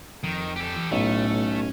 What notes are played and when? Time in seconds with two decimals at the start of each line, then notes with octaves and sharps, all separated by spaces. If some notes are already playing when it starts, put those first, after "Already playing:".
0.24 F2 D#3
0.56 G4 A4
0.91 B1 A2 A3 C#4
1.30 B1